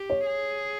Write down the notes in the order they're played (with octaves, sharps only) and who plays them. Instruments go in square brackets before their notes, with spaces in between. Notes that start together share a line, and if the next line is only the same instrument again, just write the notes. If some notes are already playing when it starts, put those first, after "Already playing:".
Already playing: [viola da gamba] G4
[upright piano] C#5
[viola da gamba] G#4